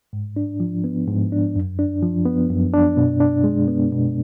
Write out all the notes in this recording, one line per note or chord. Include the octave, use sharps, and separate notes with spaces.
G#2
D4
F3
B3
G#2
D4
F#2
D4
F3
B3
F#2
D4
B2
D4
G#3
B3
B2